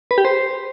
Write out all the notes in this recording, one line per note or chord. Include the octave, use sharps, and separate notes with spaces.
B4
G4
C5